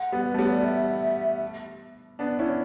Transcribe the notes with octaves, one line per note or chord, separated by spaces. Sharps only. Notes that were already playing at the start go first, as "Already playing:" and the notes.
Already playing: F#5
G3 B3
B4
A3
G3 B3 C#5
D5
E5
B3 D4
C#4 E4